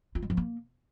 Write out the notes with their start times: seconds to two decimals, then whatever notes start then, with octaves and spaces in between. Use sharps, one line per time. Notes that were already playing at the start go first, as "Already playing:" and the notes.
0.15 F4
0.22 G#3
0.30 F3
0.37 A#3